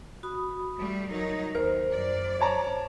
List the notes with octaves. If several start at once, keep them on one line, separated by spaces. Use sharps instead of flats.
F#4 B5 D#6
G3 A3
F#3 D#4 A#4
D#2 A#4 C5
F#2 D5
C#5 A5 A#5